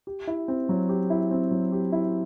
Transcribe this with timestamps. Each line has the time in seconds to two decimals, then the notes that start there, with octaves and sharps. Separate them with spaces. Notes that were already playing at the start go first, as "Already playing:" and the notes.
0.07 G4
0.27 E4
0.48 C4
0.69 F#3
0.89 G4
1.10 E4
1.31 C4
1.51 F#3
1.72 G4
1.92 E4